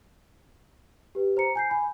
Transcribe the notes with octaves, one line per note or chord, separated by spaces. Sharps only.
G4 B4
C5 A#5 C#7
G#5 G6 C7
G#5 B5